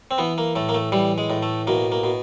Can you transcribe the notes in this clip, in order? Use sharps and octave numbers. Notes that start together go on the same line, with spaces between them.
C4
E3 B3
A#3
A2 A3
A#3
A3
E3 G3
G#3
A2
A3
B2 A#3
A#3
B2